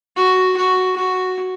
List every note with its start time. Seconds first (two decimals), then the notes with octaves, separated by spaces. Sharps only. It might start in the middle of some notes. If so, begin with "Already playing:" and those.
0.16 F#4
0.57 F#4
0.96 F#4